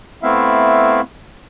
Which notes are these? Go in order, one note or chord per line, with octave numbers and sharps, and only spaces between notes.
A3 B3 C4 E4 E5 F5